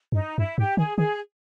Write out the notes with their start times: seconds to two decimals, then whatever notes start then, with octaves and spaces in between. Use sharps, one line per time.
0.12 G2 D#4
0.38 G2 E4
0.58 G#2 G4
0.77 D#3 G#4
0.97 D#3 G#4